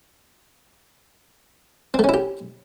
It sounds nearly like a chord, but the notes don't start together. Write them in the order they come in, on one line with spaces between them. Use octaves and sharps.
C4 A3 C#4 E4 G4